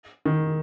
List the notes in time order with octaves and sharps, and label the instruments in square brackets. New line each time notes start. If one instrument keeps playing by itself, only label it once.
[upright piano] D#3